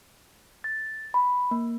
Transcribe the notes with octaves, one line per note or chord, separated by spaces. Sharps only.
A6
B5
A#3